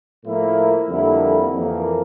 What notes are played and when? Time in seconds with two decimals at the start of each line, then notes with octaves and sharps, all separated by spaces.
0.25 A2 F3 A#3 E4
0.89 F2 D3 G3 A#3 E4
1.54 F2 E3 A#3